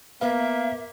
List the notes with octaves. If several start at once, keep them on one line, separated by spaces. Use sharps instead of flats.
A#3 B3 B4 E5 F5